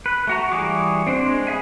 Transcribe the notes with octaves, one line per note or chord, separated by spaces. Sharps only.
B4
A3 F#4 A#5
E3 G3 F#4 G#4 D6
C4 D4 C5
G#3
B3 G#4 E5 G#5